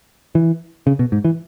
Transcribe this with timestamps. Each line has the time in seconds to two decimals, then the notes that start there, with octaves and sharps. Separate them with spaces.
0.35 E3
0.87 C#3
0.99 B2
1.12 G#2
1.25 E3